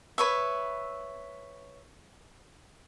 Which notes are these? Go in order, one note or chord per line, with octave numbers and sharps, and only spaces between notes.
B4 C#5 E5